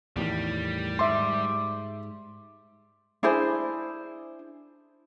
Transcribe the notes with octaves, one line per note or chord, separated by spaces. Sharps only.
E2 A2 D#3 G3
G#2 E5 C6 D6
D4 E4 G#4 C5